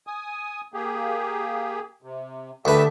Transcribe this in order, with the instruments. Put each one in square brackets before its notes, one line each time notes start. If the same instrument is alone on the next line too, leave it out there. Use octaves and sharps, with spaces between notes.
[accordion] G#5 D#6
A#3 G4 G#4
C3
[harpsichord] D2 B4 [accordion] G4 E5 A5